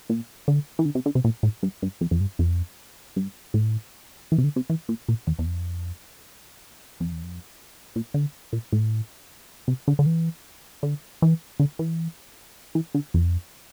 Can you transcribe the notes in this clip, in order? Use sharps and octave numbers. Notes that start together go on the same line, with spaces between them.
A#2
D3
E3
D3
C3
D3
C3
A#2
A2
G2
G2
F2
F2
G2
F2
G2
A2
E3
C3
D3
C3
E3
A#2
A#2
E2
E2
F2
F2
E2
F2
A#2
D3
A#2
A2
C3
D3
D3
E3
D3
E3
D3
E3
E3
D3
F2